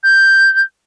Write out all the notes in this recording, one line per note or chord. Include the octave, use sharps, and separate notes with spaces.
G6